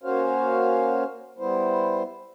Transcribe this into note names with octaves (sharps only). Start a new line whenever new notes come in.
A#3 C#4 F#4 C5 C#5 F5
G3 B3 E4 C5